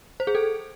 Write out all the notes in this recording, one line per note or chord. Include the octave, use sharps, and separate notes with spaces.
C5
G#4
A4